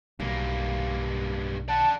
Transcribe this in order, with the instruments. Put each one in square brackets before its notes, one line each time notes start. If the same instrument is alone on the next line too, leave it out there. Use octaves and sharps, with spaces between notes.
[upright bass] B1 [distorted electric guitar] G2 A#3
[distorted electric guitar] D5 F#5 [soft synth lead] A5